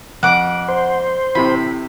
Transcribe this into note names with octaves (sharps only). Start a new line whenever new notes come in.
F2 F#5 D6
C5
A2 C3 E3 B5